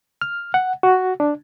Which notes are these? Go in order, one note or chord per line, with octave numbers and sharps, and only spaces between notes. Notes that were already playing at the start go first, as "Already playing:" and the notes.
F6
F#5
F#4
D4